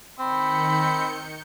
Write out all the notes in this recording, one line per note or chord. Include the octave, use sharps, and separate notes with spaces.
D#3 C4 B5 G6 C#7